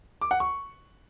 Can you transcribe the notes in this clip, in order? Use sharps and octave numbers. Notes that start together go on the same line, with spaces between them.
D6
F#5
C#6